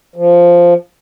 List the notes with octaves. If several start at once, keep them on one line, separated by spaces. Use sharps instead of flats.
F3